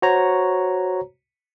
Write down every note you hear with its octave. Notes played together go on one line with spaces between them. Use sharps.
F#4 C5 C#5 A#5